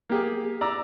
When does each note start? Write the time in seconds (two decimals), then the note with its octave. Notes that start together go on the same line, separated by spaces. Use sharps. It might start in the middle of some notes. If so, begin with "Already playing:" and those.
0.09 A#3 G4 G#4
0.61 D5 A#5 E6